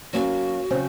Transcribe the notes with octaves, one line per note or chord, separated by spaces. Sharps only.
F#3 A#3 C#4 F#4
C#3 F#3 C4